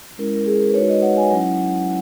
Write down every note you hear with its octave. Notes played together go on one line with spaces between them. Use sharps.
G#3 C#4 E4 A#4
A#4
G#4
A#4
B4
G#3 D#4 F#4 C#5
D#5
F#5
G#5
F#3 C#4 E4 F#5